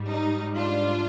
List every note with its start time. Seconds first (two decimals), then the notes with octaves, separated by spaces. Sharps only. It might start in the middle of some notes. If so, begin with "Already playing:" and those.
Already playing: G#2 G3
0.08 D#4
0.57 D4 F4